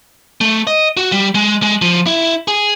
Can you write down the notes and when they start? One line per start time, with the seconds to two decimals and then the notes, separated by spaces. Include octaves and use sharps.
0.41 A3
0.67 D#5
0.97 F#4
1.12 G3
1.35 G#3
1.63 G#3
1.82 F3
2.07 E4
2.48 G#4